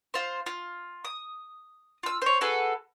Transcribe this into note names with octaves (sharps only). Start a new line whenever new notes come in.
F4 C5
F4
D#6
F4 E6
C5 C#5
F#4 G#4 A4 B4